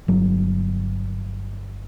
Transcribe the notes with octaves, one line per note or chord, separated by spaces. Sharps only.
G1 F#3